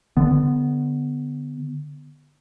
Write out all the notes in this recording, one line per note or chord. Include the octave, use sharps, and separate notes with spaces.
D3 B3